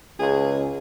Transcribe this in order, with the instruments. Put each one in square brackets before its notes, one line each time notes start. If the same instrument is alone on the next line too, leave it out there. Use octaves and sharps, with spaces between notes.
[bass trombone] C#2 [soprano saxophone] G#4